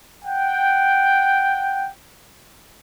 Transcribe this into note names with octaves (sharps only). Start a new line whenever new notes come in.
F#5 G5